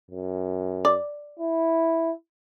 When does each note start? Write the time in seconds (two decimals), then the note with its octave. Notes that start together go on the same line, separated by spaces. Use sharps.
0.11 F#2
0.85 D5
1.39 E4